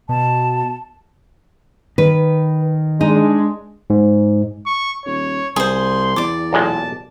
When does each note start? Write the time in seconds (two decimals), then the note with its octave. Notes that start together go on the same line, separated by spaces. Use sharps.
0.09 B2 A5
1.98 D#3 B4
3.01 G#3 D4 D#4
3.90 G#2
4.66 C#6
5.06 D#1 C#5
5.56 C2 G#4 C5 C6
6.16 E2 D5 D6
6.53 B1 A#2 G#3 A5